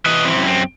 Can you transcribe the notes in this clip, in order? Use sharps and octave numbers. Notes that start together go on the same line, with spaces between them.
E3 B4 D#5
C4 E4
F#2
C4